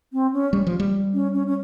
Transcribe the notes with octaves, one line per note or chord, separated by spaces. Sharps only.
C4
C#4
G3
F3
G3
C#4
C#4
C#4